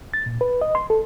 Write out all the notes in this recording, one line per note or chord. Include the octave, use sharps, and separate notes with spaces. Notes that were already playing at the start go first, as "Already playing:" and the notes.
A6
A#2
B4
D#5
C6
A4